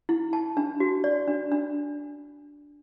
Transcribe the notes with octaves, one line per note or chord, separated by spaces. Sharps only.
E4
A5
D4
F#4
D5
D4
D4